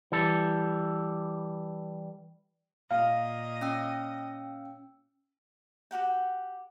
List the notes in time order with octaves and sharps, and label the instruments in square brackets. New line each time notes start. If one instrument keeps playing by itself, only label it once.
[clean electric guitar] E3 G3 A4
[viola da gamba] A#2 D#5 [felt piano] F5
[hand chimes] C#4 G5 E6
[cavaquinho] F#4 G4 F#5 G5